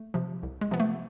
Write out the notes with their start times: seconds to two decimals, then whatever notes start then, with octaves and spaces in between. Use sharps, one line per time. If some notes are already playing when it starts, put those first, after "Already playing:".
Already playing: A3
0.14 C3 F3
0.43 C2
0.61 G#3
0.71 C3 F3 B3
0.80 A3